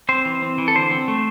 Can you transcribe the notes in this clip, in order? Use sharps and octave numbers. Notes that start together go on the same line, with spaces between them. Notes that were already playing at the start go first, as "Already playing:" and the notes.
C4 C5
E3
C4
E3
A4
D3 C5
C4
A3